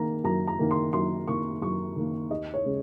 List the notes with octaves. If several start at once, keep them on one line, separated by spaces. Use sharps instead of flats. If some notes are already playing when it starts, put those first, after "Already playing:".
Already playing: D#3 A#3 A#5
F#2 A#5
A#5
D#3 A#3
C6
F#2 C6
D#3 A#3 C#6
F#2 C#6
D#3 A#3
D#2 D#5
C#5
C#3 G#3